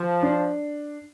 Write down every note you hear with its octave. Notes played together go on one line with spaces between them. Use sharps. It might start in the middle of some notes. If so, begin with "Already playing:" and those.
Already playing: F3
D4